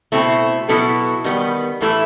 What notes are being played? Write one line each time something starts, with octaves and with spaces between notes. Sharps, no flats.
B2 A3 C4 E4
B2 F#3 B3 E4 A4
D#3 G3 B3
A2 E3 A3 E4